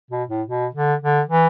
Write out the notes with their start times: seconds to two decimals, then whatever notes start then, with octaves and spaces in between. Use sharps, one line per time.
0.11 B2
0.29 A2
0.48 B2
0.75 D3
1.02 D3
1.29 E3